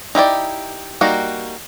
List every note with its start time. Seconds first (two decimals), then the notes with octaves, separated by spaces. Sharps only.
0.15 D#4 E4 G4 D5
1.01 G3 A#3 D#4 F#4